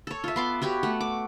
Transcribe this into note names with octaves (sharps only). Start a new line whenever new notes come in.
A4 C#5
F4 E5
B3 C6 D6
B3 F#4 G4 C#5
A3 F#5
D6